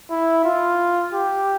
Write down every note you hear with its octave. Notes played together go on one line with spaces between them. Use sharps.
E4
F4
G4